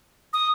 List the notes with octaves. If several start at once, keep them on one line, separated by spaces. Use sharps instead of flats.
D#6